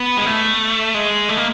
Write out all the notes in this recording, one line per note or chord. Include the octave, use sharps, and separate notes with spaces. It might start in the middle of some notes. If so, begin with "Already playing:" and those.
Already playing: B3
G#3
A3
G#3
A3
A#3